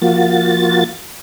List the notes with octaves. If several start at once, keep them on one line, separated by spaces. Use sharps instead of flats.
F3 A#3 F4 F#4 A6